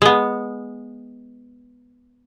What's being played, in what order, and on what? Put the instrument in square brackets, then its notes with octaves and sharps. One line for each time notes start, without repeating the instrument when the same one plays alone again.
[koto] G#3 B3